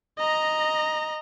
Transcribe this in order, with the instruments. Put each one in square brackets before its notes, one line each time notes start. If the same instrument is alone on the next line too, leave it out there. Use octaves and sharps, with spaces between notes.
[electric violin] D#5 A#5